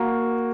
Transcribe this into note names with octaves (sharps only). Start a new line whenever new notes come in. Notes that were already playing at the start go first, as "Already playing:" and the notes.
Already playing: A#3 F#4